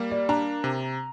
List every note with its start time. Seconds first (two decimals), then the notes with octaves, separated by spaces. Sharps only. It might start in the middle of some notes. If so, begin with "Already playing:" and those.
Already playing: G3 A#3
0.11 D5
0.29 D4 A#5
0.64 C3